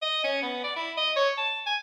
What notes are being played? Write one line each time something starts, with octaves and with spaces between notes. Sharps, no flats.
D#5
C#4
B3
D5
E4
D#5
C#5
A5
G#5